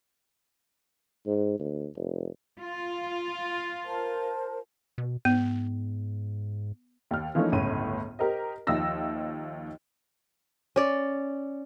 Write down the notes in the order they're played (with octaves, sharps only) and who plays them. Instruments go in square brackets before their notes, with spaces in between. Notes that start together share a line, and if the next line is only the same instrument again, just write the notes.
[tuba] G#2
D2
F1
[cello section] F4
[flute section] A#4 C5 A5
[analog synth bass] B2
[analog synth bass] G#2 [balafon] B3
[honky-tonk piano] D#2 F6
E3 F3 A3 A#3 C#4 D#4
G1 C#2 A2 C#4 D#7
G4 A#4 C5 D#5
D#2 F3 D#4 E5 E6 A#6
[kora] C#4 D5